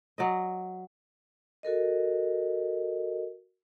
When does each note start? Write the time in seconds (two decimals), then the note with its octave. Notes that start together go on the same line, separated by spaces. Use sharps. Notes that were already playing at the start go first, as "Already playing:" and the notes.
0.18 F#3 D5 D#5
1.63 F#4 A4 A#4 D#5